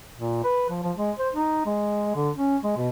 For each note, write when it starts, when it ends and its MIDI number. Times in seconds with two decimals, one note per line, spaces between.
0.17 0.40 46
0.44 0.65 71
0.70 0.81 53
0.83 0.92 53
0.97 1.11 56
1.19 1.29 72
1.34 1.65 63
1.66 2.13 56
2.15 2.30 50
2.36 2.57 61
2.64 2.73 56
2.77 2.90 47